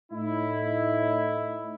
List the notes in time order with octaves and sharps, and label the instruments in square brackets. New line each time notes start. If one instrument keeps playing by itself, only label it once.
[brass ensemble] A2 D#4 E4